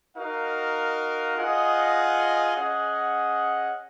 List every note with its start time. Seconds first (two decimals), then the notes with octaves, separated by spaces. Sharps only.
0.17 D#4 F#4 A#4 F5
1.36 F4 G#4 D#5 F#5
2.55 C#4 G#4 D#5 F#5